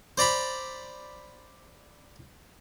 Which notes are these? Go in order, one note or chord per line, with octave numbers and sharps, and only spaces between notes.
C5 D5 A#5 B5